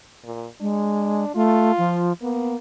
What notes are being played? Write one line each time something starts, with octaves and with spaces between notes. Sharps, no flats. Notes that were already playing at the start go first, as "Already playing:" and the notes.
A#2
G#3 D4
A3 F4
F3
A#3 B3